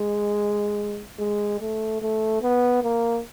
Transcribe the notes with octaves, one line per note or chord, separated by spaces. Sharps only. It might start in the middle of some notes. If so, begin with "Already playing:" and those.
Already playing: G#3
G#3
A3
A3
B3
A#3